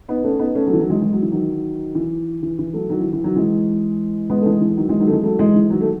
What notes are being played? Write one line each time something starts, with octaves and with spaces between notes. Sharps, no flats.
B3 D#4
A3 C#4
B3 D#4
A3 C#4
F#3 A3
E3
D#3 F#3
E3 G#3
G#3
F#3
E3
D#3 F#3
E3
E3
E3
F#3 A3
D#3 F#3
E3
E3
D#3 F#3
E3 G#3
G#3 B3
A3
E3 G#3
E3
D#3 F#3
E3 G#3
D#3 F#3
A3
E3 G#3
F#3 A3
E3 G#3
E3
D#3 F#3
A3